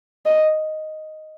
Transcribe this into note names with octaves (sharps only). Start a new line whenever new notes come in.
D#5